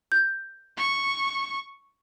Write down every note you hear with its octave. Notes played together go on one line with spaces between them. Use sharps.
G6
C#6